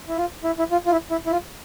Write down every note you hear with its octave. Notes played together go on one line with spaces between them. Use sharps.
E4
F4
E4
E4
F4
F4
E4
E4
E4
F4